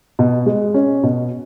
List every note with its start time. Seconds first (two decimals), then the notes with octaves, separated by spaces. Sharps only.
0.19 B2
0.46 G#3
0.74 C#4
1.03 B2